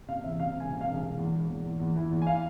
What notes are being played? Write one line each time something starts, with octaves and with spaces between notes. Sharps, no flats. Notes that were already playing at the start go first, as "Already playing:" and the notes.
C3 F5
E2 E5
C3 F5
E1
G#5
C3
F5
E1
E1
E2
E1
E2
E2
E2
E3
E2
G#5
E3 F5